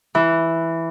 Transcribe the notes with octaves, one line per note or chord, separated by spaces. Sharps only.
E3